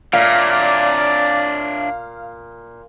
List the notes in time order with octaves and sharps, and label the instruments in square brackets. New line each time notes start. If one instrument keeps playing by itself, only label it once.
[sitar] A#2 [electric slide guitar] D4 C#5 E5 [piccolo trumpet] D5 [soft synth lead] F5